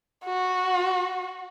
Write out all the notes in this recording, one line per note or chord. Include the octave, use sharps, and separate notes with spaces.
F#4